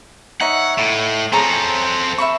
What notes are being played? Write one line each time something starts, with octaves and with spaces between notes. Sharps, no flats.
D#4 C#5 E5 F#5
A2
C4 G#4 A4 C#5 A#5
E5 B5 C#6